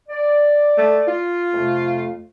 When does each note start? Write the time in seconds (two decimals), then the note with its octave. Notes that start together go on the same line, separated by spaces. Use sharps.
0.09 D5
0.78 A3
1.08 F4
1.53 F2 C3 A3